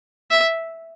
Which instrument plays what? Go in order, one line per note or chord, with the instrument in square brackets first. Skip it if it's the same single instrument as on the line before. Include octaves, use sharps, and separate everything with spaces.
[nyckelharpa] E5